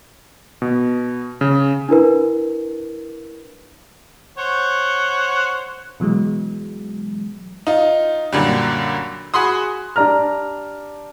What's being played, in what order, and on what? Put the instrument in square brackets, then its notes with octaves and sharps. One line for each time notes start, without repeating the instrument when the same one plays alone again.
[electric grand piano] B2
C#3
[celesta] D4 E4 A#4 B4
[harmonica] C5 C#5 F#5
[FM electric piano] B2 E3 F#3 G#3
[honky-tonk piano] D#4 F4
F#2 A#2 D3 G3
F#4 G#4 B5 C6 D#6
[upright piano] D4 G4 D5 A#5 F6